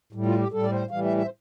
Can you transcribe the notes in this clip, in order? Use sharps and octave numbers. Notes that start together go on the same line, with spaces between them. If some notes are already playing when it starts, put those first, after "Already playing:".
A2 G3
F4
G4
A2 G3 A4
D5
C5
A2 E3 G3 F5
E5
E5
C5